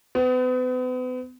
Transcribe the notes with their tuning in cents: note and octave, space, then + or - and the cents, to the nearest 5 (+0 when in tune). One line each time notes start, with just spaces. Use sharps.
B3 +40